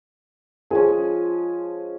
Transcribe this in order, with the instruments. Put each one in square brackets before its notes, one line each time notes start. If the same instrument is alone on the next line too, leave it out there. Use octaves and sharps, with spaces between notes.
[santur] F3 G#3 C#4 [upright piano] G#4